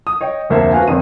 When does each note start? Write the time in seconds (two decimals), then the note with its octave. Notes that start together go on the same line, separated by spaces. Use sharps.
0.07 D#6
0.21 C#5 D#5 G5
0.49 F1 D2 A#3 C5 E5 A5
0.72 F#4 B4 C5 F5 F#5 G#5
0.87 G1 F2 D#3 C#5 D#7